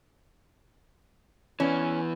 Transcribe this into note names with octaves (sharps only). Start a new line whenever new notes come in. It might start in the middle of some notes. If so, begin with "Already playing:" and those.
E3 B3 C#4